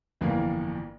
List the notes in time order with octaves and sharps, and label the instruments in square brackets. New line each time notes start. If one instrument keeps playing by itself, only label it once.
[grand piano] G1 F2 E3 A#3